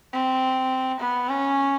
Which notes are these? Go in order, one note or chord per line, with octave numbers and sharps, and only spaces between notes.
C4
B3
C#4